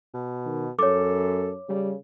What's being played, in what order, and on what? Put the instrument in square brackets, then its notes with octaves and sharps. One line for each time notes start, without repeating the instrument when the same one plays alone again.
[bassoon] B2
[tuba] D#3
[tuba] F#2 [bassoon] A4 [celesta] C#5 D6
[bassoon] C#3 [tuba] G3